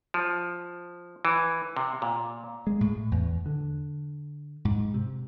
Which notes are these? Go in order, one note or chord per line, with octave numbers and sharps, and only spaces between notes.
F3
E3
C3
A#2
G#3
A2
E2
D3
G#2
C3